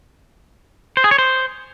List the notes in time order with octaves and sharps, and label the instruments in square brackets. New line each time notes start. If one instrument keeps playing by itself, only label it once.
[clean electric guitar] C5
G#4
C#5
C5